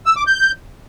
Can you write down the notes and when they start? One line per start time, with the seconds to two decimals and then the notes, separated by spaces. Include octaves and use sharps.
0.06 E6
0.16 D6
0.27 G6